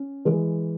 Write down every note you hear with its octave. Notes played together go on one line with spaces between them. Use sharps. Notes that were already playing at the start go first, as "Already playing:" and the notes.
Already playing: C#4
E3 G#3